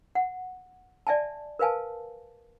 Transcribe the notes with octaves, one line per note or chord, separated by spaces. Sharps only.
F#5
D5 E5 G#5 A5
A#4 B4 F5 G#5 A5